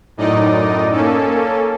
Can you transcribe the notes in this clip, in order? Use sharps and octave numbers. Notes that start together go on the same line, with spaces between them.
F#2 A2 D#4 D5 D#5
A#3 C#4 A4